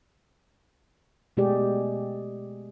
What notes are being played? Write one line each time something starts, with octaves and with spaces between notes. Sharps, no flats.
B2 G#3 A3 G4 G#4 D5